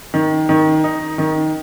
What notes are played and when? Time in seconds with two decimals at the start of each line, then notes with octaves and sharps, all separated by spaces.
0.14 D#3
0.49 D#3
0.84 D#4
1.18 D#3